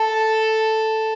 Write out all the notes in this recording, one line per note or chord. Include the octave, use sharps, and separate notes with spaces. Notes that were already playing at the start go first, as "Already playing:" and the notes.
Already playing: A4